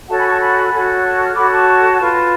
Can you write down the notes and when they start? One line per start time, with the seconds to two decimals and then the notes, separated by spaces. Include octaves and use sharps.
0.08 F#4 A4 C#5 F#5 A5
0.18 G#5 B5
0.28 A5 C#6
0.39 G#5 B5
0.72 F#4 A4 C#5
1.03 A5 C#6
1.25 F6
1.35 F#4 A4 C#5 B5 D6
1.51 A5 C#6
1.99 F4 B4